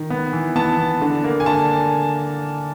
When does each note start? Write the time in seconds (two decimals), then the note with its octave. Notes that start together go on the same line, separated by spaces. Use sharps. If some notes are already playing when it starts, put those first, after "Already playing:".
Already playing: D#3
0.10 B3
0.33 E3
0.56 B3 A5
0.78 E3
1.01 D3
1.24 A#3
1.40 G#5
1.46 D3 A5